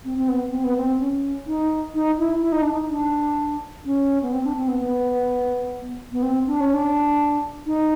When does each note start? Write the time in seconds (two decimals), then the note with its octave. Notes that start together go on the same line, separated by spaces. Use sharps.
0.05 C4
0.18 C4
0.28 B3
0.51 C4
0.64 B3
0.77 C4
0.99 C#4
1.47 D#4
1.94 D#4
2.19 E4
2.42 E4
2.52 D#4
2.62 D4
2.73 D#4
2.90 D4
3.85 C#4
4.22 B3
4.32 C4
4.44 D4
4.56 C4
4.68 B3
4.80 B3
6.12 B3
6.23 C4
6.47 D4
6.61 C#4
6.74 D4
7.66 D#4